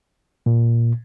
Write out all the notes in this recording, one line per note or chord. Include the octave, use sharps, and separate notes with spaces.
A#2